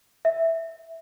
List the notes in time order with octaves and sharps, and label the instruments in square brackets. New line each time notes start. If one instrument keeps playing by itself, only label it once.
[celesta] E5